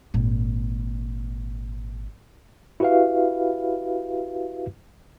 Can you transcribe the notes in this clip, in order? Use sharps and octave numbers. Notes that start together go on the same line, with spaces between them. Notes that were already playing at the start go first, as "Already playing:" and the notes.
G#1 A#2
E4 F#4 G4 B4 E5 F5